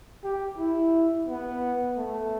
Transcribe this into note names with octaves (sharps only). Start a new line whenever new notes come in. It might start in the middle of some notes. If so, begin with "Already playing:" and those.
G4
E4
B3
A3